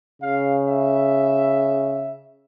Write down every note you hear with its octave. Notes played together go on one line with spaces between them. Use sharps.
C#3 F5
E5